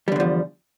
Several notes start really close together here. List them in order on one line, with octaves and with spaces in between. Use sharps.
G3 D3 E2 F3